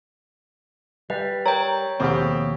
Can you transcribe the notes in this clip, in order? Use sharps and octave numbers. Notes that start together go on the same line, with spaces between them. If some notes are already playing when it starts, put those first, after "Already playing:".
G3 B4
A#4 C#5 G5 A#5
D#2 B2 F3 C4 G4 A4 F#5